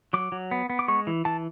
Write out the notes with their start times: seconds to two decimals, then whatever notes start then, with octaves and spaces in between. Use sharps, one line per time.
0.13 F#3 D6
0.32 F#3
0.51 B3
0.70 B3
0.79 D6
0.88 G#3 C#6
1.07 E3
1.25 E3 A5